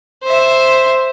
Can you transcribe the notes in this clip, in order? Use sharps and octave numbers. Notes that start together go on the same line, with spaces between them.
C5 E5